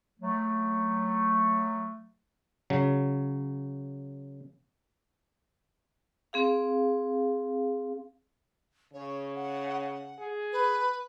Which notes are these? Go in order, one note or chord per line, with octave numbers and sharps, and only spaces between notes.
F#3 A3
C#3 F#3
C4 G#4 F5
C#3 C#5
F#5
F#5
G#4
B4